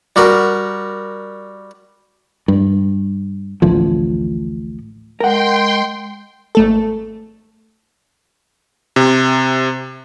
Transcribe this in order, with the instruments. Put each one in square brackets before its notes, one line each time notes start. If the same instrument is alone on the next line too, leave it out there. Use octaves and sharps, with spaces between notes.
[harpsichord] G3 F#4 A#4
[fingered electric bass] G2
A1 D2 F3
[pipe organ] G#3 [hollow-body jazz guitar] A#4 F#5 [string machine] G5 C6
[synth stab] G#1 A3 A4
[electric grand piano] C3